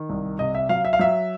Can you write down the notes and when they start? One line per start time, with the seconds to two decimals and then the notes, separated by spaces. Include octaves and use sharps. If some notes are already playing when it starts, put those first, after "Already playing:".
Already playing: D#3
0.09 C2
0.39 C3 D#5
0.55 E5
0.69 F#3 F5
0.85 E5
0.93 F5
0.99 F#3 E5